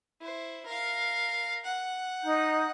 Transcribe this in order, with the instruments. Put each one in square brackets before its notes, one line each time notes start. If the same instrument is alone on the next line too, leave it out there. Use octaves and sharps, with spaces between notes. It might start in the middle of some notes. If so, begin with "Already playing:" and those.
[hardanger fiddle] E4 C5
A#4 F5
F#5
[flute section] D#4 A#5 G6